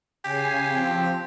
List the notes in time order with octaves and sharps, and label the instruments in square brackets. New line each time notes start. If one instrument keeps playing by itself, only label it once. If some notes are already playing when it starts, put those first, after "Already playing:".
[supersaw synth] C#3 G#5 C7 [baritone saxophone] G4
[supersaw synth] F3 C4